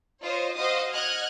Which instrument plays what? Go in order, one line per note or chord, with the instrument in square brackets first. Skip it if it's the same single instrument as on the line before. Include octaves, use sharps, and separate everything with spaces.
[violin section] F4 C5 C#5 D#5
F#4 C5 D#5 F5 D#6
D#5 F#5 F6 F#6 G#6